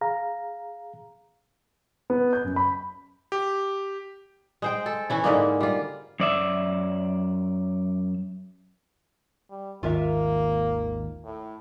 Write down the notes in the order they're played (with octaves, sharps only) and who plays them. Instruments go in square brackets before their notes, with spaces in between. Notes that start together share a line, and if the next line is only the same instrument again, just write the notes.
[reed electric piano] G#4 F5 A#5
[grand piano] B3
G6
F#2
B5
[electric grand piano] G4
[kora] G#3 C5 G5
A4
E3 C#4 E4
G#2 D3 G#3 A#3
G3 F4
[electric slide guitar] F#2 D5 E5
[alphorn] G3
[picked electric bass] G#1 D#2 [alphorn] A#3 [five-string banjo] F4 A#4 E5
[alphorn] A2